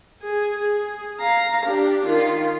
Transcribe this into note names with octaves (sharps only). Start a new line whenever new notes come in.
G#4
G#4
F5 A#5
D4 G4
D#3 F4